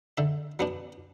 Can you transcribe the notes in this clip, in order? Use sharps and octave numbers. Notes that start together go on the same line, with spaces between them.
D3 E5
F#3 B3 D4